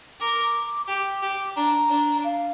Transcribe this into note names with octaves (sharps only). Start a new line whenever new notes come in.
A#4 D6
G4 D6
G4
D4 A#5
D4
F5